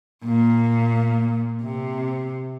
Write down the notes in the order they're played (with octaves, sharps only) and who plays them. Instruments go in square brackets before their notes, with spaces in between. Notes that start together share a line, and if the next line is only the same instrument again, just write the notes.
[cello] A#2
C3